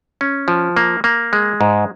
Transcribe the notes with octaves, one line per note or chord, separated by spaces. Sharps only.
C#4
F3
A#3
A#3
G#3
G#2